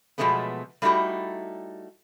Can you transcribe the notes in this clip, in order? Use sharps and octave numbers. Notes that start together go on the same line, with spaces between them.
B2 F3 F#3 G#3 A3 B3
G3 A3 D#4 E4 F#4 G4